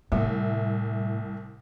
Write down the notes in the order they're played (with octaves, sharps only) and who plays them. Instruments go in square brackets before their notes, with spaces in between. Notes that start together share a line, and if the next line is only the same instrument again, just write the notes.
[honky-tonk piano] C2 E5 [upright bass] A2